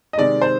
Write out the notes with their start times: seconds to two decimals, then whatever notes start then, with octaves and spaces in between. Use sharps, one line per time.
0.13 D#5
0.17 C3 D#3 G#3 D5
0.42 C5